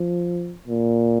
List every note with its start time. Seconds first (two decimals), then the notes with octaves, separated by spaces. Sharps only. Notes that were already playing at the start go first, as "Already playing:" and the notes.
Already playing: F3
0.67 A#2